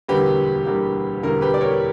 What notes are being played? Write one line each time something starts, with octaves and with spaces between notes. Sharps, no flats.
E1 D2 D3 G3 A#3 G4 B4
E1 D2 D3 G3 A#3
E1 D2 D3 G3 A#3 A#4
G4 B4
D5
A#4 C#5